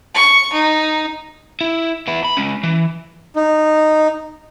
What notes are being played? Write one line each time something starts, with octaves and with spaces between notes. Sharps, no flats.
C#6
D#4
E4
B3 E4
B5
G#3 C#4
E3
D#4